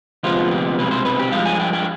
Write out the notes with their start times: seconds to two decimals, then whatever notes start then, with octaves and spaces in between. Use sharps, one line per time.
0.23 D2 C3 F3 G#3 B3 F4
0.51 G4
0.78 C2 B2 G#3 C4 B4
0.91 C5
1.05 B4
1.19 G4
1.32 G2 F3 G#3 F5
1.45 G#5
1.60 G5
1.73 G5